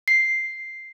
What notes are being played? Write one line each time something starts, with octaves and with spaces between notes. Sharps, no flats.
C7